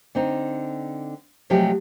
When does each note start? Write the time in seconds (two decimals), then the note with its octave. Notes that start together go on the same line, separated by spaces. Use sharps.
0.15 D3 C4 D#4
1.50 C3 F3 F#3 G#3 A3 G4